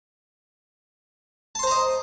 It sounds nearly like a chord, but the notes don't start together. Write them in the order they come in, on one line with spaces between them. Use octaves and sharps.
A5 C6 C5 A#5 D#5